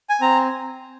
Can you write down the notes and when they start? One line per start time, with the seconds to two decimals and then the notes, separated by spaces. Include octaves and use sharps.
0.09 G#5
0.21 C4 A#5